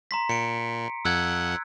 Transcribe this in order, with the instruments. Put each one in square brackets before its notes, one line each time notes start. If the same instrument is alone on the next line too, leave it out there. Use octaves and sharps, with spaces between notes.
[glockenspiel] A#5 C6 B6
[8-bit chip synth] A#2 [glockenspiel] C#7 D7
[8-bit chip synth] F2 F3 F#5 [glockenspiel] E6 F#6 G#6